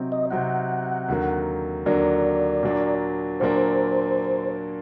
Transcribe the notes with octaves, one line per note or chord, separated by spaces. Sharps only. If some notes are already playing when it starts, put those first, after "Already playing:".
Already playing: C3 F#3 C4 D#4
D#5
C3 F#3 C4 D#4 F#5
D#2 D3 F#3 A#3
D#2 D3 F#3 A#3 D5
A#2 F#3 A#3 D4
A#2 F#3 A#3 D4 C5